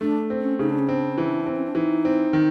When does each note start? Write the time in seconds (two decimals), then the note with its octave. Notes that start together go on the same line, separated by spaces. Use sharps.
0.01 A3 D4
0.30 C4
0.41 C#4
0.59 C#3 D#4
0.70 D4
0.79 C#4
0.88 C4 D4
1.18 E3
1.46 C4
1.55 C#4
1.65 D4
1.75 E3 D#4
2.05 C4
2.33 D#3